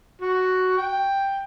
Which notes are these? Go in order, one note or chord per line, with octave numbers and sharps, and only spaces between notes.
F#4
G5